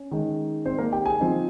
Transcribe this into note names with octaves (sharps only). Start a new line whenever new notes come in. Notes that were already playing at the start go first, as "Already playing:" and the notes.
Already playing: C#4
D#3 G#3 D#4
C4 C5
A#3 A#4
G4 G5
G#4 G#5
F3 C4 D#4